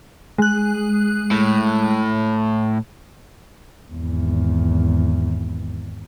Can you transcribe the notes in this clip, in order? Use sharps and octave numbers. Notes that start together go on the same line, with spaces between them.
G#3 F#6
A2
G#1 E2